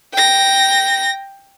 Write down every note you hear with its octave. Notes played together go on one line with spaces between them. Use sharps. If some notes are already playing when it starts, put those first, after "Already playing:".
G5 A#6